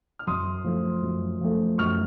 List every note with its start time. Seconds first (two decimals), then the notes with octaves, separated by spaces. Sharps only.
0.19 F6
0.27 F#2 C6 D#6
0.64 F3 A3
1.02 F#2
1.41 F3 A3
1.78 F#2 C#6 F6